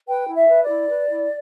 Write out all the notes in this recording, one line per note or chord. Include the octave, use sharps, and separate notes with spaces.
B4 G5
E4
E5
B4
D5
E4
B4
E4